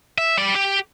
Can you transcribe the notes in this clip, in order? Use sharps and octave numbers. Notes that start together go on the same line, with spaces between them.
E5
G3 D5
G4